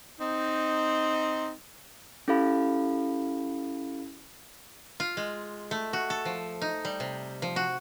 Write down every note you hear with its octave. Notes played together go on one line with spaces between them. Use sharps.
C4 D#4
C#4 E4 G4 A4 F5 B5
F4
G#3
A3
F#4
A4
F3
D#4
G3
C3
F3
F#4